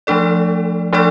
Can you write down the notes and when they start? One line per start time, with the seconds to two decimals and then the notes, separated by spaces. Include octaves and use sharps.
0.07 F3 A3 D4 A4 D5
0.93 F3 A3 D4 A4 D5